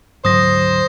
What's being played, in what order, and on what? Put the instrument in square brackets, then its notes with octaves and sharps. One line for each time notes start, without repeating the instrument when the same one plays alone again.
[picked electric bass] D2 G#2 F#3 [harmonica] C5 [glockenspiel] D#6 A#6